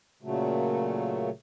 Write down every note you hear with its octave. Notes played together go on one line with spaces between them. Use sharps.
A#2 C#3 F#3 A3